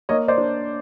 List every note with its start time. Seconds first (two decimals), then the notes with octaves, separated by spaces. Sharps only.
0.09 A#3 C#5 D#5
0.28 C5 D5
0.38 D4